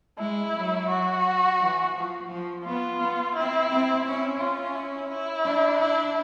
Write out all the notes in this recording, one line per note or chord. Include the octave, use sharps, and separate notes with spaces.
G#3 E4
F#3
F#4
E3
F3
F3
B3 F4
B3
C4 E4
C4
C#4 E4
C#4 F4
E4
E4
D4
E4